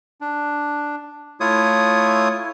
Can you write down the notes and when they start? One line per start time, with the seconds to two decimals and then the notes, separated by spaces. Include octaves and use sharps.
0.21 D4
1.40 A3 E4 F4 C#5 D#6